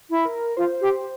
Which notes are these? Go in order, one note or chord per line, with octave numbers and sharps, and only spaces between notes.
E4
A#4
F4 C5
G4